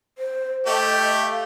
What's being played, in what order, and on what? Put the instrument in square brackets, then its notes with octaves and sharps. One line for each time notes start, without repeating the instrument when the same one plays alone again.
[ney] C5
[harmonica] A3 G4 [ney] D#5
[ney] F5